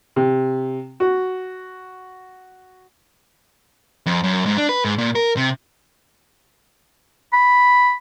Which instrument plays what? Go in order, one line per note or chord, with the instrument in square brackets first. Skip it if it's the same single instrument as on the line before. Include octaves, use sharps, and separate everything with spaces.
[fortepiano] C3
F#4
[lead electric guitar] F2
F#2
G#2
D4
B4
G#2
A#2
A#4
C3
[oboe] B5